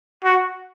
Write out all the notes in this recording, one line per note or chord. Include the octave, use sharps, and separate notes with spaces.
F#4